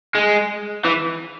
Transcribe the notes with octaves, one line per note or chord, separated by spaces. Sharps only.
G#3
E3